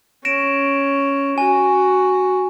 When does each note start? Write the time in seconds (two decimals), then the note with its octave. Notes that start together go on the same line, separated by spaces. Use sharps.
0.25 C#4 A#6 D7 E7
1.38 F#4 G#5